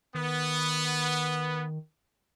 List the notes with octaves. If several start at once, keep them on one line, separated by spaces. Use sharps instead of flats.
D#3 B3